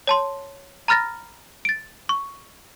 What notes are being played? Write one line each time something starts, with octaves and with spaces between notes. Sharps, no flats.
C#5 A5 C6
A#5 B5 F6 A6 A#6
A6 D7
C#6